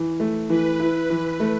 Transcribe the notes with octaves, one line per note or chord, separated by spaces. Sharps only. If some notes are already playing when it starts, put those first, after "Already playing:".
Already playing: E3
A3
E3 B4
E4
B4
E3
A3